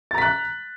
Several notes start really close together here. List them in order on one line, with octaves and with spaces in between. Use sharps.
A6 A#5 B6 F#6